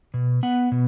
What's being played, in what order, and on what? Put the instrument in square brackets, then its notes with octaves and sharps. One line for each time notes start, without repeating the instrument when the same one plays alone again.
[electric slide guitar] B2
B3 F#5
B2